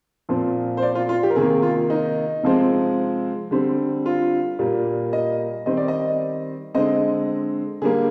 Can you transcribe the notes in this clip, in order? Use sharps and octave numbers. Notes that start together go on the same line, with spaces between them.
A#2 F3 C4
C5
D5
F4
F4
G4
A#4
C3 D#3 A#3 G#4
F4
D#4
C3 F3 G#3 C4
D3 G3 C4
F4
A#2 G3 A#3
D#5
D#3 G3 C4 D#5
D5
D#5
D3 G#3 C4 D#5
D3 G3 A#3 G#4